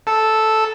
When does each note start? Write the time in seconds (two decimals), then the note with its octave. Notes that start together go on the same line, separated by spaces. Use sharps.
0.07 A4